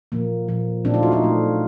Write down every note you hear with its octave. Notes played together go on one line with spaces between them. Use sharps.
A#2 F3 A#3
A#2 F3 A#3
A#2 F#3 A3 C4 D4
D#4 F4
E4 F#4
D#4 F4
A#2 F#3 A3